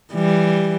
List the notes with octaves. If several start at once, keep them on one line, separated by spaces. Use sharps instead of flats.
E3 G3